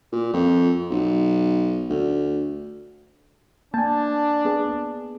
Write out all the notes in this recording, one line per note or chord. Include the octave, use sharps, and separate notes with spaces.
A#2
F2
B1
D2
A#3 D4 G#5 A5
B3 G#4